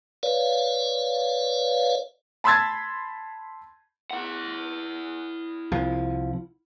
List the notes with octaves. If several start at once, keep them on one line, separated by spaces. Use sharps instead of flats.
B4 C#5 D5 F5
A5 B5 C6 E6 G#6 A6
E4 F#5
C2 F3